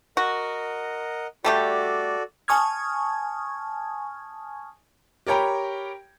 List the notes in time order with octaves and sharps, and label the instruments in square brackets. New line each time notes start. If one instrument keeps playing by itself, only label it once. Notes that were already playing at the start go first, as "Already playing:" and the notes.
[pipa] F#4 [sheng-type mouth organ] A#4 D#5 F#5
[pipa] G3 A3 G4 [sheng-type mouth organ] F#4 A4 D5
[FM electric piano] G#5 A5 C#6 D#6 F6 G#6
[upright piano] G4 A#4 C#5 G5 A#5 B5